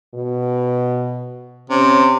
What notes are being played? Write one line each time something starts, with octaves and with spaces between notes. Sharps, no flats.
B2
C3 C#4